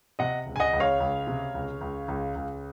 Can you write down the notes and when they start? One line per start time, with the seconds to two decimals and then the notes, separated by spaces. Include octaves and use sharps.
0.19 C3 D#5 F#5
0.46 C#2
0.56 G#5
0.60 D#5 F#5
0.73 C#2
0.80 C#5 F5
1.00 C#2
1.27 C3
1.55 C#2
1.81 C#2
2.08 C#2
2.35 C#2